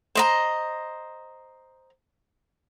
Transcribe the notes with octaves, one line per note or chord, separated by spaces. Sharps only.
C5 D#5 A#5